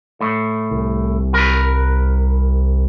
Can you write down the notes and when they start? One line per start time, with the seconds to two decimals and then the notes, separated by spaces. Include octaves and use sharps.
0.21 A2
0.71 C2
1.34 A#4 B4